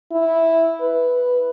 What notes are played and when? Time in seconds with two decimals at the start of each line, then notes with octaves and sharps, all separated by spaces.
0.11 E4
0.81 B4